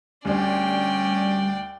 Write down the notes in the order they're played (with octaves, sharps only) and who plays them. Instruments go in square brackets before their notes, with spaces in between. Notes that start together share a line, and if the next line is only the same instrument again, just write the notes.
[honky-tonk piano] D2 D4 C5 [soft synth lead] G3 [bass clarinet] C#4 [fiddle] D5 G5